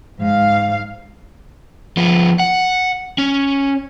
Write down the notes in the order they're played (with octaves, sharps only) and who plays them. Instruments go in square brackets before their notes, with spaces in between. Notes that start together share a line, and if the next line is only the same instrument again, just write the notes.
[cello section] G#2 F5
[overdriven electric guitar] F3 B3
F#5
C#4